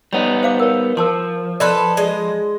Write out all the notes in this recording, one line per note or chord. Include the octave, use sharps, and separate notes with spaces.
G3 B3 D#4 C#5 B5
C5 F5 D6
A#4 C#5
F3 A#4 A5 C6
A4 B4 C5 D5 D#5
G#3 D5 D#5